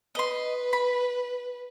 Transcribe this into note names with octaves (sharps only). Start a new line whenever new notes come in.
B4 D#5 C6
B5